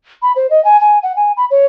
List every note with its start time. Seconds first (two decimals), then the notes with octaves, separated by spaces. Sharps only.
0.22 B5
0.36 C5
0.50 D#5
0.65 G#5
0.81 G#5
1.03 F#5
1.16 G#5
1.37 B5
1.51 C#5